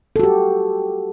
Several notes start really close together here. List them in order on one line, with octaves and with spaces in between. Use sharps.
A4 F#4 G4